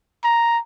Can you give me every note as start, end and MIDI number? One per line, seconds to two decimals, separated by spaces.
0.24 0.59 82